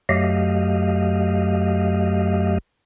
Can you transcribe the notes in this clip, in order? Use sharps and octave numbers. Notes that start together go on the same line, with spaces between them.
F#2 F#3 A3 G4 D#5 F5